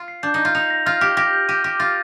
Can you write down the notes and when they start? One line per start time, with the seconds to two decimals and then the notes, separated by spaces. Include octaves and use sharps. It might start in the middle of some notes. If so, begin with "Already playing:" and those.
Already playing: F4
0.08 C7
0.23 D4 G6
0.34 D#4 G6
0.45 F4
0.55 D#4 F7
0.70 A#6
0.86 F4 F6
1.01 G4 F6
1.17 G4 A#6
1.33 G6
1.48 G4 D#7
1.64 G4 D6
1.80 F4 A6